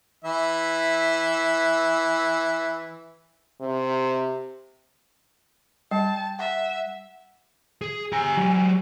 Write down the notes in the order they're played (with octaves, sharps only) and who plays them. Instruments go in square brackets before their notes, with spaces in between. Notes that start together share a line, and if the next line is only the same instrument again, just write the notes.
[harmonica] E3 E5
[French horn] C3
[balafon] G3 [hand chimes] G5 [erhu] A5
[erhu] E5 [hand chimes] F#5
[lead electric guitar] G#4
[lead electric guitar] G4 A#5 [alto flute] G#5
[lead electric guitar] F#3 G4